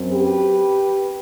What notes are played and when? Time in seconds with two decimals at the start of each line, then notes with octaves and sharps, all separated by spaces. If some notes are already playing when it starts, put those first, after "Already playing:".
Already playing: F#2 F#3 C4
0.11 G4 B4